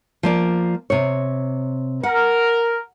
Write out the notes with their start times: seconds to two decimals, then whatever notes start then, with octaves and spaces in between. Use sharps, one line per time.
0.23 F3 A#3 D5
0.90 C3 C#5
2.03 A#4 F#5